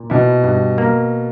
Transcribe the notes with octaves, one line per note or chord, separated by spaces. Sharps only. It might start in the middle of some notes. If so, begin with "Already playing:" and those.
Already playing: A#2
B2 E4
G2
A#3